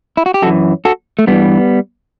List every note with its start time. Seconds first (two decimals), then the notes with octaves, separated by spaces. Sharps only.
0.17 E4
0.26 F#4
0.34 G4
0.42 F#2 F#4 A4
0.46 E3
0.85 F#4 A4
1.19 A3
1.27 G2 E3 G3 B3